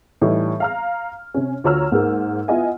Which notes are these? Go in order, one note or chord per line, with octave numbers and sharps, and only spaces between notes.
A2 E3 G3 D#4
F5 A#5 F6
C3 C#4
D2 F4 C#5 A#5 E6 F6
G#2 A#3
B3 E4 F4 D#5 F#5 G#5